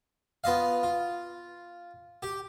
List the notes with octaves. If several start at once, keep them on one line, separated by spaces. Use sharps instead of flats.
B3 F4 D#5 F5
F4
G4